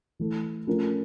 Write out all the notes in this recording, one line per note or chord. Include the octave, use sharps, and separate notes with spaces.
E3 A3 E4 A4
F3 A3 C#4 F4 A#4